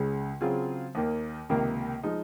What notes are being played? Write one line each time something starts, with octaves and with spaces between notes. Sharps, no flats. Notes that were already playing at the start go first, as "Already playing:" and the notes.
Already playing: C#2 C#3 G#3
C#3 F#3 C4 F4 G#4
D#2 D#3 A#3
C#2 C3 D#3 A#3
F3 G#3 D#4